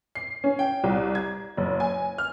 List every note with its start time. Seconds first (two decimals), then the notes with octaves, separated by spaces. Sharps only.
0.15 C7
0.44 C#4
0.59 G5
0.84 C2
1.15 G#6
1.57 F#1
1.80 G#5
2.18 F6